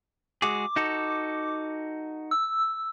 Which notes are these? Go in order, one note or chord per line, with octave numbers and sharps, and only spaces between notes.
G#3 F#4 G#4 D6
D#4 F#4 A4
E6